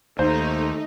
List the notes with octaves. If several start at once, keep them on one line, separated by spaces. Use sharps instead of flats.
D#2 A3 D#4 C5